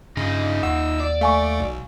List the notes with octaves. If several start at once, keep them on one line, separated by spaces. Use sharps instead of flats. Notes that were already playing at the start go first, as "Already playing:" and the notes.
G2 C#3 D#4 F4
D#2 F#5 E6
D5
A3 F5 G#5 C#6
B1